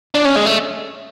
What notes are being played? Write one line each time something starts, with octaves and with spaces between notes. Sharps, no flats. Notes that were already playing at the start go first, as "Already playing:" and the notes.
D4
C#4
G#3
A3